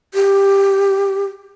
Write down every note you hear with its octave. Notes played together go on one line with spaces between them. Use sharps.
G4